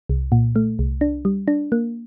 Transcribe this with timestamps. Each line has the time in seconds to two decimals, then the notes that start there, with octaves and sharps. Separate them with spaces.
0.09 C2
0.32 A#2
0.56 A3
0.79 C2
1.01 D4
1.25 G3
1.48 D4
1.72 A#3